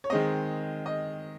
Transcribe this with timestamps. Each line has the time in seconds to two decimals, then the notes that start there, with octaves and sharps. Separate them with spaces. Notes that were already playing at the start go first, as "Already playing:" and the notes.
0.04 C#5
0.10 D#3 G#3 C4 D#5
0.86 D#5